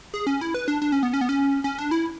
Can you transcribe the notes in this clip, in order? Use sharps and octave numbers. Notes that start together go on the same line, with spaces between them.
G#4
C#4
E4
B4
D4
D4
C#4
B3
C#4
B3
C#4
C#4
D4
E4